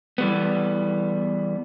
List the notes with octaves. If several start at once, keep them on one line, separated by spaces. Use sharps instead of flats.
E3 G3 B3